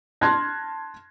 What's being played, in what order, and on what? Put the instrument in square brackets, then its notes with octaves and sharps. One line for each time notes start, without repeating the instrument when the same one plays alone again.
[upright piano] A5 C6 F6 F#6 G#6 A#6